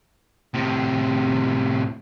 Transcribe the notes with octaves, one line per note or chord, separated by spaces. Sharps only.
A2 C3